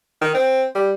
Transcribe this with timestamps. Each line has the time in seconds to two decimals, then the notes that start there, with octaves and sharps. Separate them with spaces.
0.21 D#3
0.34 C4
0.75 G3